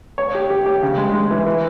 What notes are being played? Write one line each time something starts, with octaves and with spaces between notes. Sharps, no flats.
C#5
G4
G4
G4
C#3
G#3
G#3
E3
E3